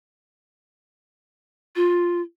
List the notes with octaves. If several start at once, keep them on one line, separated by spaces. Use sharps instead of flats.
F4